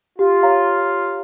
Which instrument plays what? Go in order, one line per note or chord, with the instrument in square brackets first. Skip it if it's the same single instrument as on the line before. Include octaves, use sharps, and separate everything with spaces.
[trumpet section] F4 [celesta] G4
[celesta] C#5 F5 A#5